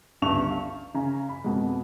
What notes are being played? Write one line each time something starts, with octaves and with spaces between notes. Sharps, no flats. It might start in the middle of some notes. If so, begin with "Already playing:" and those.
G1 C#2 G2 A5 C#6 F7
F5
C#3 G#5 A#5
B5
F2 B2 G#3